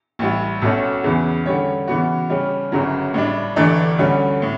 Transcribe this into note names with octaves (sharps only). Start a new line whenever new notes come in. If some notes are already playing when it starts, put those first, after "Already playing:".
A1 A2 G3
B1 B2 A3 C#4
E2 C#3 E3 B3
D3 G3 C#4 G4 C#5
C#3 E3 B3 F#4
C#3 G3 C#4 G4
G1 F#2 C#3 F#3
A2 G3 D4
G1 G2 E3 A3 D4
D2 D3 G3 C#4
A2